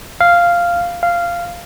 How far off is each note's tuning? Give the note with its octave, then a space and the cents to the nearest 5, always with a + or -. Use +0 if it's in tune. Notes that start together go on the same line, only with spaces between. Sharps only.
F5 -5
F5 -10